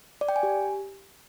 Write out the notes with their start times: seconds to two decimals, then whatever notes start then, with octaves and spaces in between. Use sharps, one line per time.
0.21 D5
0.29 G5
0.36 G#5
0.43 G4